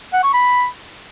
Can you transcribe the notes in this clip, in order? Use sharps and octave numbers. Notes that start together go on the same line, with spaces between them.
F#5
C#6
B5